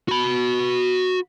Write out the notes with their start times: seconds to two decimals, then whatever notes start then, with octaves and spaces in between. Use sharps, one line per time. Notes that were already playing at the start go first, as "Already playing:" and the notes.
0.08 F#4 B5